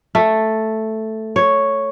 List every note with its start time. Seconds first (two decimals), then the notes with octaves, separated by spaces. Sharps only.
0.15 A3
1.36 C#5